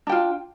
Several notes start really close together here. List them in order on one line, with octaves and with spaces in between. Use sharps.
D4 G5 F4